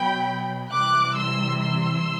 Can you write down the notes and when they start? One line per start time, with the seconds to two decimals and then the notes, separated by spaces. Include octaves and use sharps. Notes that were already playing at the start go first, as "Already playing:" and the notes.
Already playing: B2 F#3 G5 B5
0.72 C3 E3 G3 D6 F#6
1.16 C6 E6
1.61 C6 E6